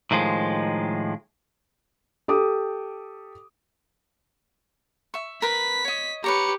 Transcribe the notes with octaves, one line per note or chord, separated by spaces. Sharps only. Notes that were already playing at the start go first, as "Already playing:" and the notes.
A2 D#3 F3 G#3
G4 A4 D6 D#6
E5 C#6
A#4 B4 B5 B6
C#5 D#5
G4 B4 C#5 A#5 C#7